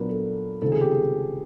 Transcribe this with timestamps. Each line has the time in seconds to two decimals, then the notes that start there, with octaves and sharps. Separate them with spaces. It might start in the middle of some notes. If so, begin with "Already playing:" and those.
Already playing: A#2 F#3 B3 D4 A#4 B4
0.09 A4
0.62 C#2 C3 D#3 A4
0.72 G#4
0.81 G4
0.91 G#4